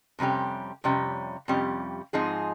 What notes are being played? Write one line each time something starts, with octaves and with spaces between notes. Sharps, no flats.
F2 C3 G3 C#4 G4
F2 C3 G3 C#4 G4
F2 C3 G3 C#4 G4
G#2 F3 C4 D#4 G#4